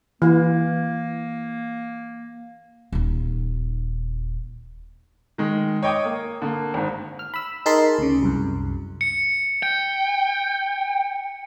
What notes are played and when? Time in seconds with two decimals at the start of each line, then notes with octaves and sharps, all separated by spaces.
0.22 E3 A#3
2.92 D#1 D#4
5.38 D#3 G#3
5.83 C#5 D#5 G5 D6 D#6
6.05 A#3
6.42 D3 A#3
6.74 G#1 G#2
7.19 F6
7.34 B5 E6
7.66 D#4 G#4 A#4 A5 B5 C6
7.99 D2 C#3
8.23 C2 F#2
9.01 C#7
9.63 G5